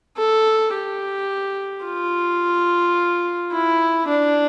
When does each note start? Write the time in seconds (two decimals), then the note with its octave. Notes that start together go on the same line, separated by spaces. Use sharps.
0.18 A4
0.74 G4
1.86 F4
3.52 E4
4.08 D4